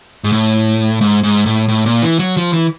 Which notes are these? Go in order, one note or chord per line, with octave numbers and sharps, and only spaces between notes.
G#2
A2
G#2
G#2
A2
A2
A#2
E3
F#3
F3
E3